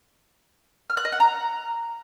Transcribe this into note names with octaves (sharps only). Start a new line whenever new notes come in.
F6
F#6
D#5
F#5
A#5